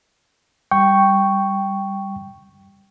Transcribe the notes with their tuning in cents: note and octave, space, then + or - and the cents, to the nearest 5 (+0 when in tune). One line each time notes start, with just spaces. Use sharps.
G3 +5 G5 -5 C#6 +0